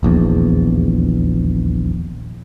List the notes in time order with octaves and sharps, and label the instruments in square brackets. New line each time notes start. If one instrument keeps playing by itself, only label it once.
[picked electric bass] D#1 A#1 E2